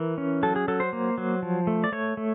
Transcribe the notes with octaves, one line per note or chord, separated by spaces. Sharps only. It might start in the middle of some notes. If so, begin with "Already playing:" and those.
Already playing: E3 A#4
C#4
F#3 A4
G#4
F#3 A4
C5
A#3
F#3
F3
A3
D5
A3 C#5
A3